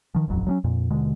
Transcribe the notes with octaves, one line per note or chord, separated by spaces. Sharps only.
D#3 F3
D#1 A1 F2 F#3
F#3 G#3 C#4
F2 A#2
D#2 B2 D3 G#3